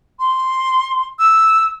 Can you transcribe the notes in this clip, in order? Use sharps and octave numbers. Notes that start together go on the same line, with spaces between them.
C6
E6